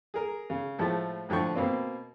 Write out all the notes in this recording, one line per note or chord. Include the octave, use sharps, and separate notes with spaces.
G#4 A#4
C#3
A2 F3 G#3 A3
A2 D3 F3 G5 C#6
B2 A#3 C4